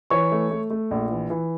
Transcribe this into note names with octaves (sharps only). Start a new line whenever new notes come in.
E3 C#5 C#6
A3
A3
A3
A#1
E3
E3